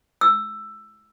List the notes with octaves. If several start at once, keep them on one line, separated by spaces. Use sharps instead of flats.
E6